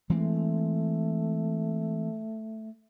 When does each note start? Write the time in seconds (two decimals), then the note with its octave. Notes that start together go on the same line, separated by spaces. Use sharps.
0.10 E3 G#3 A3 C4